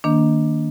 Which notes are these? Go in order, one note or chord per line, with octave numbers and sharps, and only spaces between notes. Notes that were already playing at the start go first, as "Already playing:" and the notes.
D#3 A#3 D4